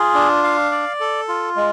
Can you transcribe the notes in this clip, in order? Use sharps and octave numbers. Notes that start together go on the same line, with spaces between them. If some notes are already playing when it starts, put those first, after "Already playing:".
Already playing: F4 G#4
D4
F5
D5
A4
F4
G#3